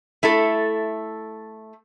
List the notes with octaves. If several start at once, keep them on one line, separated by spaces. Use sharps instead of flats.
A3 E4 A4